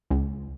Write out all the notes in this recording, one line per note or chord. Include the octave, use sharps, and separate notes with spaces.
C#2